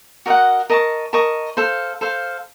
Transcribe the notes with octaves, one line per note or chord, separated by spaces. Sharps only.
F#4 A#4 D#5 F#5
A#4 D#5 A5 C#6
A#4 D#5 A5 C#6
A4 C5 F5
A4 C5 F5